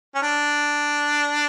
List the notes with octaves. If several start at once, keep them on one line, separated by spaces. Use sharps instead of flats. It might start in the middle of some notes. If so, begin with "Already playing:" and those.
C#4
D4